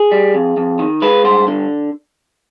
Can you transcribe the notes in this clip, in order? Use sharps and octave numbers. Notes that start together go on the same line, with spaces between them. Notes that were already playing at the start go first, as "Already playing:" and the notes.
Already playing: G#4
G3
F2
F2
D#3
G#3 B4
G2 C5
D3